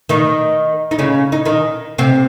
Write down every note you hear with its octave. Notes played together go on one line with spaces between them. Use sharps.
D#3 D#4
D#4
C#3 C#4
D#4
D#3 D#4
C3 C4